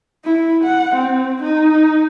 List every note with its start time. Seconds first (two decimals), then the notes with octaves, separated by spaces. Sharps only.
0.24 E4
0.64 F#5
0.95 C4
1.42 D#4